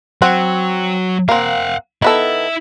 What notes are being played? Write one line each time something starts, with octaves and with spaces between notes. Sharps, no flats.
F#3 C4 F#5
A#3 C4 F5 F#5
D#3 B3 E4 A4 E5